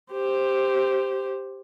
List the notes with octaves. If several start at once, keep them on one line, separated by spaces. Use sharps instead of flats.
G4 C5